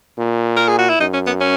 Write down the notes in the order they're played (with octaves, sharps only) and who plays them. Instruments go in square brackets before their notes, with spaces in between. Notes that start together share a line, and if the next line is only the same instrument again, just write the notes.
[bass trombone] A#2
[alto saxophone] A#4
G#4
F#4
E4
[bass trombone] F#2 [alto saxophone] D#4
[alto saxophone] C#4
B3
C#4